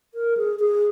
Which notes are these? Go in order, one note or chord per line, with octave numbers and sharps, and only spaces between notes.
A#4
G#4
G#4